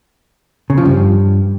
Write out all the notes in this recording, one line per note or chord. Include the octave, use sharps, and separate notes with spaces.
C#3
F3
G2